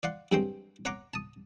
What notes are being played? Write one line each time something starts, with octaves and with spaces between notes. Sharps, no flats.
D5 F5 F#5 C6
G2 F#3 G#3 C4 G5 C6
C#5 F#5 A#5 C6 D6
A5 D#6